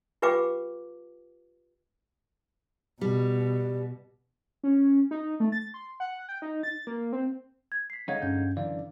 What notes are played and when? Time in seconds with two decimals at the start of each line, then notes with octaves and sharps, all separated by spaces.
0.22 F4 G4 B4 F5 G5 D6
3.01 B2 G3
4.64 C#4
5.11 D#4
5.40 A3
5.52 A6
5.74 C6
6.00 F#5
6.29 G5
6.42 D#4
6.63 A6
6.87 A#3
7.13 C4
7.72 G#6
7.90 B6 C7
8.08 D3 G#3 D#4 C#5 D#5 F5 F#5 G#6
8.22 G2 C#4 G6
8.57 F#2 D3 E3 D5 F5